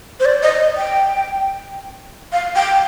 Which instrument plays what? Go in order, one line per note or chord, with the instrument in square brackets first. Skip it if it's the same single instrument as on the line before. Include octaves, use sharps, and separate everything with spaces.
[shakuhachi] C5
D5
D#5
G5
F5
G5